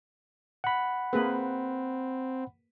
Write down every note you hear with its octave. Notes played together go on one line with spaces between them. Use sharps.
F#5 B5
A#3 C4 G#4 B4